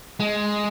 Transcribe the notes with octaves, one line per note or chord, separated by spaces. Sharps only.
G#3